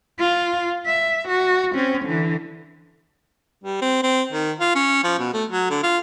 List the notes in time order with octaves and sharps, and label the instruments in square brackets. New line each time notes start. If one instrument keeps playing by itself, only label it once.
[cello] F4
E5
F#4
C4 C#4
D3 E3
[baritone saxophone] G3
C4
C4
D#3
F4
C#4
F3
B2
A3
F#3
D3
F4